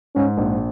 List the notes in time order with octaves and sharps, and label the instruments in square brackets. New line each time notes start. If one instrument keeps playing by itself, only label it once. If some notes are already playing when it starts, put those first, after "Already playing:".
[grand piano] G#2 [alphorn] C#4
[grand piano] A#1